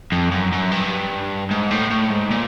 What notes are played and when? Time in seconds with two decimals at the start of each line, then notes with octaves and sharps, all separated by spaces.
0.12 F2
0.31 F#2
0.52 F#2
0.72 G2
1.51 G#2
1.70 A2
1.91 A2
2.11 G#2
2.31 A#2